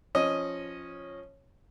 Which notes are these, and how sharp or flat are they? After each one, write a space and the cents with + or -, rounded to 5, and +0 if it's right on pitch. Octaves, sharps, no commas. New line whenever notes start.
F3 +0 C#4 -10 D#5 +0